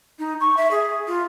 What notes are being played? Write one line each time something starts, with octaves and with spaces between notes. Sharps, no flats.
D#4
C#6
E5
G#4
F4